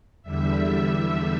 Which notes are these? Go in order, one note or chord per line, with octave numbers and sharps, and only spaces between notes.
E2 D3 G3 E5